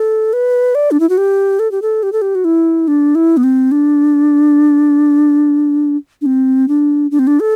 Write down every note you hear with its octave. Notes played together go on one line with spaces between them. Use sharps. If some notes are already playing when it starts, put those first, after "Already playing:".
Already playing: A4
B4
D5
D4
E4
F#4
G4
A4
G4
A4
G4
A4
G4
F#4
E4
D4
E4
B3
C4
D4
D4
C4
D4
D4
C4
D4
A4